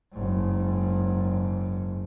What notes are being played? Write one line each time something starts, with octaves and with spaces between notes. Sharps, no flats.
F#1 G#2